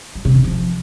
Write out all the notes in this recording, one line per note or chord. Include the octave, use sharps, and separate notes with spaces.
F#3
C3
D#3
F3